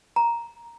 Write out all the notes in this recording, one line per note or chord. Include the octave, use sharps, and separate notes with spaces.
A#5